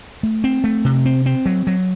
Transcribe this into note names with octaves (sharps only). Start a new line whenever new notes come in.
A3
C4
A3
C3
C4
C4
F#3
F#3